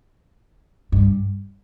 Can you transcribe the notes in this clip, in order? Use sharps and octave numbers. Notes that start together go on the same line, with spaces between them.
G2